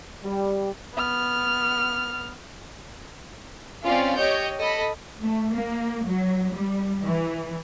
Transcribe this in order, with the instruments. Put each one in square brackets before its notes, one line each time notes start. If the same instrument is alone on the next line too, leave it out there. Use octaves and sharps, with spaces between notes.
[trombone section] G3
[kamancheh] B3 F6
[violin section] C4 C#4 F4 D5
G4 C#5 D#5 G6
A4 D#5 B5
[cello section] A3
A#3
F#3
G3
E3